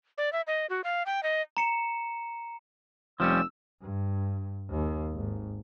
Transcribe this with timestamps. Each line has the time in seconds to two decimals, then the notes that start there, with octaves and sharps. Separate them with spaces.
0.18 D5
0.33 E5
0.47 D#5
0.70 F#4
0.84 F5
1.06 G5
1.23 D#5
1.57 A#5 C#7 E7
3.20 F1 F3 G3 C#4 E6
3.82 G2
4.70 D#2
5.13 G#1